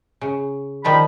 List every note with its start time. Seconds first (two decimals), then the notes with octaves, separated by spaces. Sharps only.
0.21 C#3
0.84 D#3 F3 G3 B5